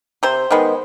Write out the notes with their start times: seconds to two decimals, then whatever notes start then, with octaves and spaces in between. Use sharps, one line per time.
0.23 C3 C5
0.51 D#3 G#3 B3